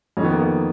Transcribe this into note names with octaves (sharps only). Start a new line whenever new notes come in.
F2 D#3 B3 C#4
A#3
B3